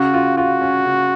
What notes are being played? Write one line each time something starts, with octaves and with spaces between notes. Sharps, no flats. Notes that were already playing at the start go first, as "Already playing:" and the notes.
Already playing: C#3 F#4
F4
F4 F#4
C#4
C#3